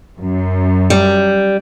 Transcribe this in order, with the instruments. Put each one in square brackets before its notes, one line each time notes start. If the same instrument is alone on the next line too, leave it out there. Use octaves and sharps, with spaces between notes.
[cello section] F#2
[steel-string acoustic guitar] G3